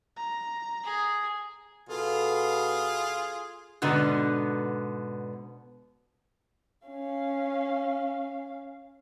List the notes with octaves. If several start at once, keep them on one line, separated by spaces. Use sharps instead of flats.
A#5
G#4
B2 F4 G#4 A4 E6
G#2 B2 D3 B3
C#4 F5